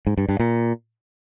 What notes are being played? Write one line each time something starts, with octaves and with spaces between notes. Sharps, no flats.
G#2
G2
G2
A#2